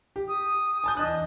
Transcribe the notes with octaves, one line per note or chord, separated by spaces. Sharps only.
G4
D#6
G#5 A5 G6
E2 D4 D#5 F#6